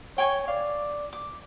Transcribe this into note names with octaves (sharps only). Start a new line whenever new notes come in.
C#5 G5 G#5 C#6
D5 F5
D6